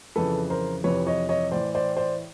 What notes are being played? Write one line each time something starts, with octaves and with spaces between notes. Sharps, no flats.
F2 C#3 E3 A4 B4
A#4 C5
F2 C3 E3 B4 C#5
C#5 D#5
C#5 D#5
A2 E3 C5 D5
C5 D5
C5 D5